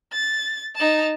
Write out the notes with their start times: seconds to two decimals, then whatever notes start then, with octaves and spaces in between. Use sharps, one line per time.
0.12 A6
0.76 D#4 A5